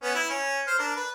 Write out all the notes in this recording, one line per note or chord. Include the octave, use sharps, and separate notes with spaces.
B3 C#4
E4
C#4
C5 F6
D4 A#4
B4